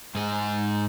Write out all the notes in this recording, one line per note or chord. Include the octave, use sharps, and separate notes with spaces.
G#2 G#4